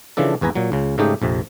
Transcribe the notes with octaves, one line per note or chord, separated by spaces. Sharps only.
C#3 E3 F3 D4 A4
G#1 E2 B4 G#5 A#5
A#2 F#3
C#2 C#3
G#2 C#3 A3 D#4 G4 G5
A#1 F2 C3